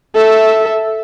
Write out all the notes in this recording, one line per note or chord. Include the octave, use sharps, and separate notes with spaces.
A4 E5